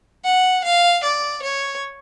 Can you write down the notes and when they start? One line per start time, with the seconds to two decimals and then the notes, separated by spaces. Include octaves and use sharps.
0.24 F#5
0.63 F5
1.03 D5
1.42 C#5